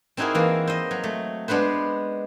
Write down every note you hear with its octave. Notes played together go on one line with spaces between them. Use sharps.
C4 D#4 E4 F#4 G#4 A#4
E3 A#3
C5 D#5
F#3
A3
G#3 B3 D4 B4 C5